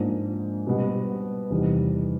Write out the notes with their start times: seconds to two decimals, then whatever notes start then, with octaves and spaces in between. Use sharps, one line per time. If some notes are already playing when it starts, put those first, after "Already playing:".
Already playing: G#2 F3 A#3 D4
0.67 B2 G3 B3
1.50 E2 C3 D#3 G3